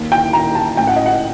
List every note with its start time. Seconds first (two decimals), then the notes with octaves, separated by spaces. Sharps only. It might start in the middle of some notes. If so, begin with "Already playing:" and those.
Already playing: D#2
0.12 G5
0.33 D#2 A#5
0.55 A5
0.77 A1 G5
0.87 F#5
0.96 D#5
1.06 F#5